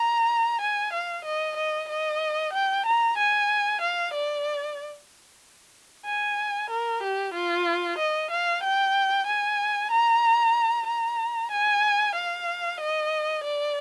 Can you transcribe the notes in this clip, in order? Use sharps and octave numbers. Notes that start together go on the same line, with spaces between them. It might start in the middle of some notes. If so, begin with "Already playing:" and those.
Already playing: A#5
G#5
F5
D#5
D#5
D#5
G5
A#5
G#5
F5
D5
G#5
A#4
G4
F4
D#5
F5
G5
G#5
A#5
A#5
G#5
F5
D#5
D5